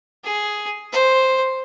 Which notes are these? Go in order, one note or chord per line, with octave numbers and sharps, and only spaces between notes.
G#4
C5